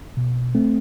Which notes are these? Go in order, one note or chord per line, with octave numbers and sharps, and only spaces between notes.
B2
A3 C4